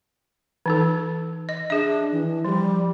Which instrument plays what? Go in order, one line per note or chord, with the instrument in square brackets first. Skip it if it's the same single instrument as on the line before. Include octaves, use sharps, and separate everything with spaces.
[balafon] E3 D#4 A4
D#5
[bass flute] D4 [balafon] G#4 E5
[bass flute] E3
[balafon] F3 [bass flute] G3